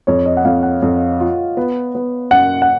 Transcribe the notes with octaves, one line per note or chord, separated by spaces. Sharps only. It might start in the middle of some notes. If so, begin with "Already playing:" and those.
F2 C#5
D#5
F#5
F2 F5
F#5
F2
F4
B3
B3
F#2 F#5
F#5